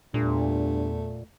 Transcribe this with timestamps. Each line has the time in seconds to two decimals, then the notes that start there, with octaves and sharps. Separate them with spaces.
0.14 E2 G2 A#2 A3